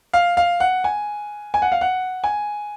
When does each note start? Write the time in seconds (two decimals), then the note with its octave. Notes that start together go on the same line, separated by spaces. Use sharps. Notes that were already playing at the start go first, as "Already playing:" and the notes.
0.13 F5
0.37 F5
0.60 F#5
0.84 G#5
1.54 G#5
1.62 F#5
1.72 F5
1.81 F#5
2.24 G#5